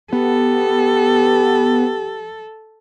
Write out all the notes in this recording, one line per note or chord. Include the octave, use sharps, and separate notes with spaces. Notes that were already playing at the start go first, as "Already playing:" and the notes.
B3 G4 A4